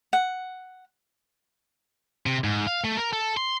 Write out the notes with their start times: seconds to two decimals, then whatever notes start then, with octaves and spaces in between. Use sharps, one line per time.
0.13 F#5
2.26 C3
2.44 G#2
2.67 F5
2.84 A3
2.97 A#4
3.13 A4
3.37 C6